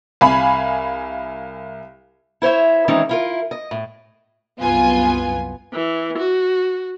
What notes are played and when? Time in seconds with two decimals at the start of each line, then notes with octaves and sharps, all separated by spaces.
0.21 C2 F5 G#5 B5
2.42 E4 C5 C#5 E5
2.88 D#3 E3 G#3 C4 C#4 D#4
3.09 E4 F4 A#4
3.51 D#5
3.71 A2
4.60 C2 F#2 B3 F4 G#5
5.73 E3
6.18 F#4